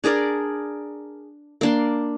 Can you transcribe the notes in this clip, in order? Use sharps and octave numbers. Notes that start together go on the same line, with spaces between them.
D4 G#4 A#4 D5
A#3 D4 C6